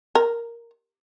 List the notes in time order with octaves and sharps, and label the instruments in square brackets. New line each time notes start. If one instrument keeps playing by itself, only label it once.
[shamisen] A#4